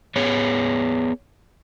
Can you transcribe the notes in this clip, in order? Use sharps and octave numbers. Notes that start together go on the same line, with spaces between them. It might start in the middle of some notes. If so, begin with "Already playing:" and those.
B3 G#4 C#5